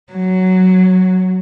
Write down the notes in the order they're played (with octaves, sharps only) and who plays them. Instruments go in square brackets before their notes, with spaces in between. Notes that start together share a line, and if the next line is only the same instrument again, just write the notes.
[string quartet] F#3